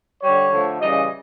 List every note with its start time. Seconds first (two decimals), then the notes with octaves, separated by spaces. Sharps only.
0.21 D3 G3 C#5
0.51 D3 F3 A3
0.80 C#3 E3 G3 D#5